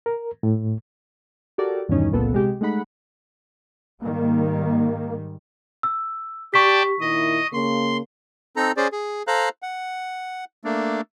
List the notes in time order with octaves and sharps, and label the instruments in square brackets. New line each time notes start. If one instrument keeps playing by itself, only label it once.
[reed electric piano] A#4
A2
[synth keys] F#4 G4 A4 A#4 D5
E2 G2 B2 D#3 C#4 D#4
G1 C#2 A#2 B3 A4
C3 G#3 G4
G#3 A3 D#4 F#5 B5
[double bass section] G#2 D#3 G3 [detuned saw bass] A#3
[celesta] E6
[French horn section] G4 [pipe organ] D5 G5 A5 [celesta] C#6 B6
[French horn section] A#2 D#3 E4 [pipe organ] D#5
[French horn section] C#3 A#3 [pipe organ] C6
[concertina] C4 D#4 A4 A#5
C#4 G#4 C5 D5
G#4
A4 C5 F5 A#5 F#6
F#5
A3 A#3 D4